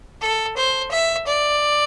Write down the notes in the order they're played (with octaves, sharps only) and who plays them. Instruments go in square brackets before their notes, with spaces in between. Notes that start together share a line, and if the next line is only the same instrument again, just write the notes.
[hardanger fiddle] A4
C5
E5
D5